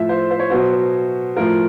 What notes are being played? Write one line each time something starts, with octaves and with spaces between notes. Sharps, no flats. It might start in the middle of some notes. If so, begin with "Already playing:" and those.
Already playing: A2 F3 E5
C5
C5
C#5
B2 F#3 C5
A2 F3 A#4